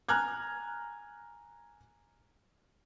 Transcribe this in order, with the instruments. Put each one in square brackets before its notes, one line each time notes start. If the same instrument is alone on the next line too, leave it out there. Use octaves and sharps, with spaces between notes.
[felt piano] G#5 A#5 F6 F#6 G#6